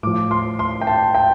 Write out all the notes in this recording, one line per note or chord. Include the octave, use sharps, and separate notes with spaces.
A2 F3 D6
C6
C6
G5
A5
G5